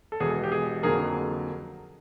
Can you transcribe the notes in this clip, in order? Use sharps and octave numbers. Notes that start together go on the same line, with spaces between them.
A4
E1 E2 B2 G#4
G4
G#4
F2 D3 F#3 A#3 G#4 A#4